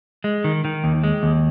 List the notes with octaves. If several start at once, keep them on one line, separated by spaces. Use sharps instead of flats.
G#3
D#3
D#3
D#2
G#3
D#2